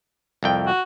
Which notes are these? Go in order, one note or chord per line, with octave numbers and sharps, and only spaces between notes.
C2 F2 G5
F#4